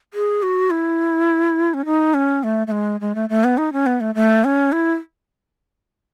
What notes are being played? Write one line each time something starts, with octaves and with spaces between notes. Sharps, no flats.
G#4
F#4
E4
C#4
D#4
C#4
A3
A3
G#3
G#3
A3
A3
B3
D#4
C#4
B3
A3
A3
C#4
E4